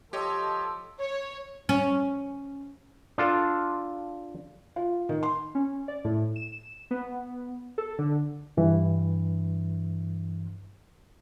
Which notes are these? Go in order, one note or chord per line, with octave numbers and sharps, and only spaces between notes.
F3 G4 A4 C#5 D#5
C#5
C#4
D4 F4 A4
F4
D#3
C6
C#4
D5
A2
E7
B3
A4
D3
G2 E3